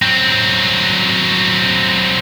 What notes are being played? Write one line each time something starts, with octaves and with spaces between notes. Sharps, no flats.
F#3 C4